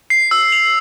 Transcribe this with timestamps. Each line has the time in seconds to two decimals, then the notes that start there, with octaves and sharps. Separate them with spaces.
0.10 C7
0.31 E6
0.52 F7